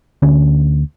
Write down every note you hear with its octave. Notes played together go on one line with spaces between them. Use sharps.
D2 D3 C#4